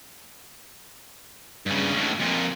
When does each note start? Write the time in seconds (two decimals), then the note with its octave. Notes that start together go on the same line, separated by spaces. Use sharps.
1.66 G2 C#3
1.94 C#2 A2
2.20 F2 A#2